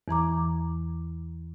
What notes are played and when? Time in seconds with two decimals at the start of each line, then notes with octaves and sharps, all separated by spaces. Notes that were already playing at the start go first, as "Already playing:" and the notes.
0.08 E2 E3 A#5 D6